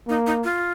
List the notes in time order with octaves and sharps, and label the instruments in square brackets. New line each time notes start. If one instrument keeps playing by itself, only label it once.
[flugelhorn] A#3 [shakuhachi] D#4
[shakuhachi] D#4
F4